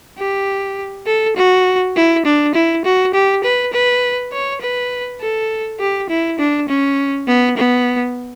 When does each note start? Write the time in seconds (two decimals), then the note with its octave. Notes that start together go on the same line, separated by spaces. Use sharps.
0.18 G4
1.06 A4
1.36 F#4
1.96 E4
2.25 D4
2.54 E4
2.85 F#4
3.13 G4
3.44 B4
3.73 B4
4.32 C#5
4.61 B4
5.21 A4
5.80 G4
6.09 E4
6.39 D4
6.68 C#4
7.28 B3
7.57 B3